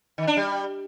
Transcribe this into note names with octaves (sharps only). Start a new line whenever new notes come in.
D#3
D4
G3